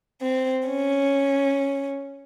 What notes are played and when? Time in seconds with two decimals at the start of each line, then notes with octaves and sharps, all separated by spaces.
0.21 C4
0.67 C#4